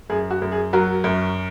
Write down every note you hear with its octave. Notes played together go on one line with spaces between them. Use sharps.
F#2 G#4
F#4
F#2
G#4
F#3 F#4 A#4
F#2